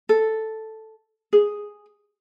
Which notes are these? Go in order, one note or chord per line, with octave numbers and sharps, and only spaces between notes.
A4
G#4